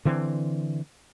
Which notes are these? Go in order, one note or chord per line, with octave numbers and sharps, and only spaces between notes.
D3 E3 C4